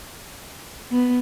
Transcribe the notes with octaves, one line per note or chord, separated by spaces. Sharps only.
B3